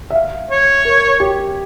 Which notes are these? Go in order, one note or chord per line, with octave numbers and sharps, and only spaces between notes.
E5
F5
C#5
A#4
G4